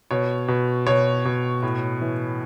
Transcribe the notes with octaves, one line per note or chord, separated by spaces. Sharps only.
B2 C#5
B2
B2 C#5
B2
A2
E3